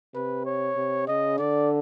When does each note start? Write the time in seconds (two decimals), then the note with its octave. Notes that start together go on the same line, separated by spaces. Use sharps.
0.14 C3 B4
0.45 C#5
0.77 C3
1.08 C#3 D#5
1.38 D3 D5